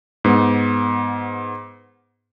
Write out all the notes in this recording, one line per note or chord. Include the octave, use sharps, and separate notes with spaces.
G#2 B3